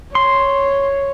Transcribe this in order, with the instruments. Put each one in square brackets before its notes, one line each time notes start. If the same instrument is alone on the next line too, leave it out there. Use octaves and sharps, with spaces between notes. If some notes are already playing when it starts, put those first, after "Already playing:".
[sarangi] C#5 [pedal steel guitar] C6